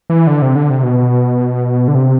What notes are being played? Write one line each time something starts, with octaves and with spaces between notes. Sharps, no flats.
E3
D3
C3
D3
C3
B2
D3
C3